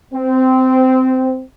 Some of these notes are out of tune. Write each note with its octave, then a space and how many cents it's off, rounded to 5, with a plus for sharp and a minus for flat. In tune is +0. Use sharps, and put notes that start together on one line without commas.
C4 -15